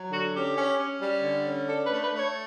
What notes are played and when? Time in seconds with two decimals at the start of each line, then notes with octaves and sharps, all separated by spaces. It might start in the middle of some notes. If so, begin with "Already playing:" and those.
Already playing: F#3
0.10 D3 F#4
0.33 C#4 G4
0.56 C#4
0.78 C#4
1.00 G3
1.22 D3
1.44 C#4
1.66 D4 A4
1.83 B4
1.89 A3
2.01 B4
2.11 A3
2.17 C#5